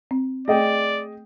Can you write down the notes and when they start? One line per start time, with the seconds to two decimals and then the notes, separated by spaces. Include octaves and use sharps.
0.11 C4
0.48 A3 G#4 D5 D#5 G5